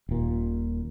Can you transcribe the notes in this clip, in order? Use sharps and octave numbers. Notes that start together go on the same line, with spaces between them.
D#1 A#2